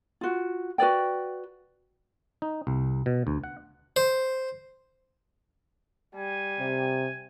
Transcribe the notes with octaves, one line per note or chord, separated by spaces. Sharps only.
F4 F#4
F#4 B4 D5 G5
D#4
C2
B2
D2
F#5
C5
G3 G#5
C3